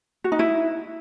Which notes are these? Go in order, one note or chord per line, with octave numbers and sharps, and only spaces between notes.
F#4
D#4
E4